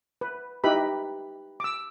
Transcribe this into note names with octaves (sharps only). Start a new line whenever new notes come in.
B4
D#4 E4 G4 B4 B5
D6 E6